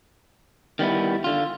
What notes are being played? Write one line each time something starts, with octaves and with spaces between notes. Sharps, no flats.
D#3 G3 B3 E4
D3 F4